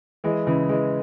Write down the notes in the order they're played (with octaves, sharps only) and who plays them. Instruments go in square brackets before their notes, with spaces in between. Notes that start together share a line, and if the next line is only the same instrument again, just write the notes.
[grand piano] E3 G#3
C#3 E3
E3 G#3